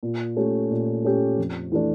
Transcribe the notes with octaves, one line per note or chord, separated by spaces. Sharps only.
A#2
A3 C#4 G4
A#2
A3 C#4 G4
F2
E3 A3 D4